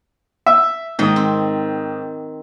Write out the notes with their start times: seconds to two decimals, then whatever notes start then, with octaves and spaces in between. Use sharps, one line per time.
0.46 E5
0.99 G#2 D#3 G5 D#6
1.16 C4